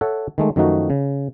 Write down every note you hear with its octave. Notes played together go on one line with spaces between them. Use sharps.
A4 C#5 E5 F#5
D#3 G#3 A3
F#2 D#3 F3 A3 D#4 F#4
C#3